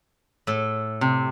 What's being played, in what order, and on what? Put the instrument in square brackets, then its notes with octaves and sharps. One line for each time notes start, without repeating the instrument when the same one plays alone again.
[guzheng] A2 A4
[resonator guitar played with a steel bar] C3